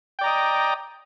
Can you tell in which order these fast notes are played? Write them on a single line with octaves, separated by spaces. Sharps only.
G5 D5 A#5 D#5